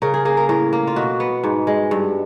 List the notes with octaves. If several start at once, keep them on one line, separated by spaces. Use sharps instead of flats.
C#3 A#4
G#4
A#3 G#4
A#4
A2 A#4
A#3
F4
B2 F#4
B3
G#2
G#3
G2